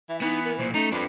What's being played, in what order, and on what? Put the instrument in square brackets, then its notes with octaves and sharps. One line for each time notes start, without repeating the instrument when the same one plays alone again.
[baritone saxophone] E3 [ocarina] E5
[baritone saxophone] E3 [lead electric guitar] B3 [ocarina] D#4
[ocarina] A#4
[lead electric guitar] B1 A#2 [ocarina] C5
[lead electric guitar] A3 [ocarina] C#4 [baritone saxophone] D#4
[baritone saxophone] F2 [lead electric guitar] D4 B4